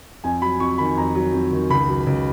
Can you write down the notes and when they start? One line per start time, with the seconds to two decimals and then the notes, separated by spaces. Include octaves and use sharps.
0.24 F2 G#5
0.42 F#3 B5
0.60 F2 C#6
0.78 D#3 B5
0.97 F2 A#5
1.15 F#3
1.33 F2
1.52 D#3
1.70 C#2 B5
1.88 F#3
2.07 C#2